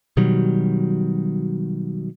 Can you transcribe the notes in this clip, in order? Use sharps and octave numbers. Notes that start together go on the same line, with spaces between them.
B2 D#3 F#3 G3